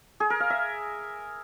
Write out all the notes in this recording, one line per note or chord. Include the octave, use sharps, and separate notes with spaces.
G#4
A#4
F5
E5